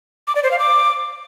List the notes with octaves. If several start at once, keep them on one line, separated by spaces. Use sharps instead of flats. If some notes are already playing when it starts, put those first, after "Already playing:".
D6
D5
C5
F5
D6